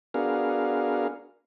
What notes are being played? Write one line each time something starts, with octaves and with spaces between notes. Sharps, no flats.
B3 D4 F#4 G#4 A#4 F5